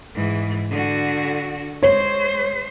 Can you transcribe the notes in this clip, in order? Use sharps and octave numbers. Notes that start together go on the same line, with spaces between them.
G#2 E3
D3 F#4
G#3 C5 C#5